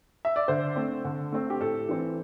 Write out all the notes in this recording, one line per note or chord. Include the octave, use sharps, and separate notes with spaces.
E5
D5
D3 C5
A3 C4
D3
A3 C4
G4
A2 A4
E3 C4